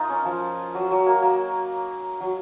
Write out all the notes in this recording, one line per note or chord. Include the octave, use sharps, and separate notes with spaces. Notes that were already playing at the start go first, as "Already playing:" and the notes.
Already playing: A#3 D#4 F4
C#4
F3
F#3
F#3
A#3
A#3
F#3